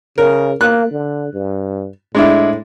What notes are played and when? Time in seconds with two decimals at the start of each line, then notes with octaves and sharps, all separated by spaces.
0.18 C#3 A#4
0.61 A#3 F#6
0.91 D3
1.34 G2
2.15 A2 G#3 D4 E4